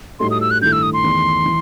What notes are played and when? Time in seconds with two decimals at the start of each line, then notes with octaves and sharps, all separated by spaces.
0.20 A2 G3 D#4 F#4 A4 C6
0.31 D#6
0.41 E6
0.51 F#6
0.61 G2 D#3 A3 E4 A4 G6
0.72 E6
0.83 D#6
0.93 C6
1.04 E2 D#3 A3
1.45 E3